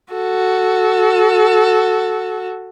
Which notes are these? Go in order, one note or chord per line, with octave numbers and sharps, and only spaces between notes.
F#4 A4